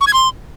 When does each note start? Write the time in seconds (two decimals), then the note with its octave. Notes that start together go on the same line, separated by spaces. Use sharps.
0.01 C#6
0.07 G#6
0.13 C6